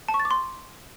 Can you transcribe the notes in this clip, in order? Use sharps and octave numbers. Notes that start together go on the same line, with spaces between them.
A5
C#6
A6
D6
C6